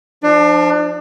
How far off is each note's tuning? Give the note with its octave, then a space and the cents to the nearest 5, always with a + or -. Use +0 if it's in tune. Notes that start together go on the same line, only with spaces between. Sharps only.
F3 +0 D4 +30